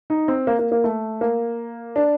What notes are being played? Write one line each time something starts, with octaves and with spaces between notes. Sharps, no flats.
D#4
C4
A#3
A#3
A#3
A3
A#3
D4